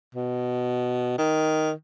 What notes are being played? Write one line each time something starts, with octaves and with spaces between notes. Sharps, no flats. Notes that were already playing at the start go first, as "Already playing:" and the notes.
B2
D#3